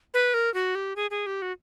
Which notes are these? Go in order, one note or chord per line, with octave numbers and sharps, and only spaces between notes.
B4
A#4
F#4
G4
G#4
G#4
G4
F#4